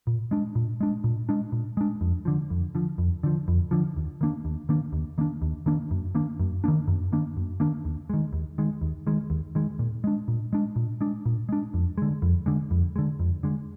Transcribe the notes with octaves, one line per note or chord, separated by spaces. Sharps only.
A#2
G#3 D4
A#2
G#3 D4
A#2
G#3 D4
A#2
G#3 D4
F2
D3 F3
F2
D3 F3
F2
D3 F3
F2
D3 F3
D#2
D#3 A#3 D4
D#2
D#3 A#3 D4
D#2
D#3 A#3 D4
D#2
D#3 A#3 D4
F#2
D#3 A#3 D4
F#2
D#3 A#3 D4
F#2
D#3 A#3 D4
F#2
D#3 A#3 D4
D#2
D#3 G#3
D#2
D#3 G#3
D#2
D#3 G#3
D#2
D#3 G#3
A#2
G#3 D4
A#2
G#3 D4
A#2
G#3 D4
A#2
G#3 D4
F2
D3 G#3
F2
D3 G#3
F2
D3 G#3
F2
D3 G#3